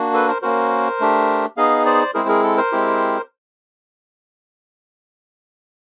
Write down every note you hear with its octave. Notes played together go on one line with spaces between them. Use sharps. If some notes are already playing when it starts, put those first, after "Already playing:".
Already playing: A#3 D4 F#4
A4 B4
A#4 C5
A#3 C#4 F#4 A#4 C5
A3 D4 G4
B3 D#4 G#4 D#5 F5
C5 D5
G#3 C4 E4 G#4 A#4 C5
G#4 A#4
A4
A#4 C5
G#3 C4 E4 G4